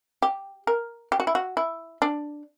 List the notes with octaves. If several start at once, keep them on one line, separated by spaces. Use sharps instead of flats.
G4
A#4
G4
F#4
E4
F#4
E4
D4